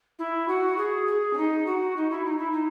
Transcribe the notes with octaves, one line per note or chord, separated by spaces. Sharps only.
E4
F#4
G#4
G#4
C#4
D#4
F#4
D#4
E4
D#4
E4
D#4